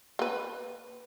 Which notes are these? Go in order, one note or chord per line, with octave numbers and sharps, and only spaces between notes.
A#3 B4